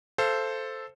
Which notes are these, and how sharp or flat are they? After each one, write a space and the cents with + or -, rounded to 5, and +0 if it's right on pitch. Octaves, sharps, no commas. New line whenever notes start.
A4 +0 C5 +0 F5 -30